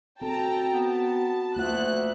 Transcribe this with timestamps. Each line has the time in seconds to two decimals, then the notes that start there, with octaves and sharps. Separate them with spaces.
0.22 C4 F#4 A4 G5 A5 A#5
0.73 B3 A5
1.56 D2 A#3 F4 F#5 F#6